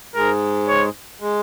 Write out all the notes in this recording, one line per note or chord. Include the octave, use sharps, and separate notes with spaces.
G#2 G#3 A#4
C#5
G#3